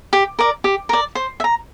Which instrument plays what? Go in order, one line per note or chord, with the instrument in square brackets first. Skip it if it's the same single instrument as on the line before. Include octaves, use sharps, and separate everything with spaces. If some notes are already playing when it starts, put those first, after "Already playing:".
[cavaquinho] G4
A#4 D5
G4
A#4 D5
C5
E5
A#5